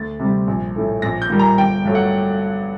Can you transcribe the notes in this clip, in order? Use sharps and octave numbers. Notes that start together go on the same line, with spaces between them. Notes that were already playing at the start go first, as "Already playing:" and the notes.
Already playing: D2 A6
C3 G3
A#1
A2 A3
A#1 A#6
G6
A#2 G3 A#3
A#5
G1 G5
G2 F#3 A3
F#5